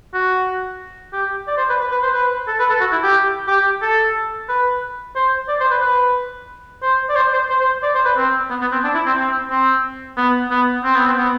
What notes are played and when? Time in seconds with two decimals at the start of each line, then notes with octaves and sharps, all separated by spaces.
0.14 F#4
1.13 G4
1.48 D5
1.58 C5
1.70 B4
1.81 B4
1.91 B4
2.03 C5
2.14 B4
2.47 A4
2.59 B4
2.70 A4
2.80 F#4
2.92 E4
3.03 G4
3.48 G4
3.82 A4
4.49 B4
5.16 C5
5.48 D5
5.61 C5
5.71 B4
5.82 B4
6.82 C5
7.09 D5
7.16 C5
7.33 C5
7.50 C5
7.61 C5
7.83 D5
7.95 C5
8.05 B4
8.17 C4
8.50 B3
8.61 B3
8.72 C4
8.84 D4
8.94 E4
9.06 C4
9.17 C4
9.50 C4
10.17 B3
10.50 B3
10.84 C4
10.95 B3
11.06 C4
11.18 B3